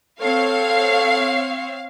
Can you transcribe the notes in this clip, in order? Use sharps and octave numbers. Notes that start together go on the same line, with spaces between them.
C4 A4 C#5 F5